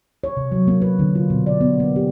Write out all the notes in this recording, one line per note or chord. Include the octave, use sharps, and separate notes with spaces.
C#5
C3
F#3
A#3
B4
D3
F4
B2
D5
B3
A#3
G4